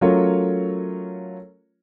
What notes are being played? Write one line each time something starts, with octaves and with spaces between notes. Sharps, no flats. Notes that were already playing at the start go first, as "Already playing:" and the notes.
F#3 A3 C#4 F4 A#4 C#5